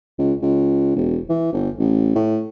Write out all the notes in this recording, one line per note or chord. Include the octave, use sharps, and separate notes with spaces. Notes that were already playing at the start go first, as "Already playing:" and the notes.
C#2
C#2
E1
E3
G1
A1
A2